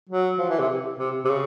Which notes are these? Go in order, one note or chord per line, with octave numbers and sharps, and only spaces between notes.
F#3
F3
E3
C3
C3
C3
C#3